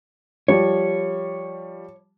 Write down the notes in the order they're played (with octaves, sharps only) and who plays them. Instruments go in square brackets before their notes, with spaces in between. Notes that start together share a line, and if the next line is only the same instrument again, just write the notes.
[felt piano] F3 G3 [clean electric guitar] C#5